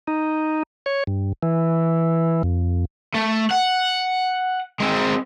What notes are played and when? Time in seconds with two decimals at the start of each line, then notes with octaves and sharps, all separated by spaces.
0.08 D#4
0.86 C#5
1.07 G2
1.43 E3
2.43 F2
3.15 A3
3.51 F#5
4.81 G#3 C4